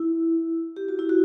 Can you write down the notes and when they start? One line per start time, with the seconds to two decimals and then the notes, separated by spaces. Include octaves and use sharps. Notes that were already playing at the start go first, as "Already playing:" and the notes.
Already playing: E4
0.76 G4
0.89 F#4
0.99 E4
1.09 F#4